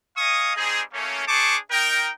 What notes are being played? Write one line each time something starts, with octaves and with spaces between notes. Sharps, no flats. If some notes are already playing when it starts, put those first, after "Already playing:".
D#5 F5 G#5 C#6 D#6
G3 C4 D#4 G#4
A3 A#3 C#4
D4 G#4 C5 A5 C#6 D6
D#4 A#4 G5